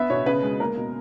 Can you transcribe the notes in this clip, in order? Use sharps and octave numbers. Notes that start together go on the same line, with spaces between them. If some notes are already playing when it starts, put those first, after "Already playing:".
Already playing: B3 E5
B2 C#5
C#3 B4
G#3
A#3 A#4
B2